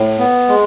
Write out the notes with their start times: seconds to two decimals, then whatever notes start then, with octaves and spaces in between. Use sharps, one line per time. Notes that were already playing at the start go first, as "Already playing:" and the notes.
Already playing: A2
0.18 B3
0.48 G#3